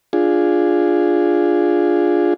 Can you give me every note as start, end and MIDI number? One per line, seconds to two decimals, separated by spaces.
0.13 2.34 62
0.13 2.34 65
0.13 2.34 68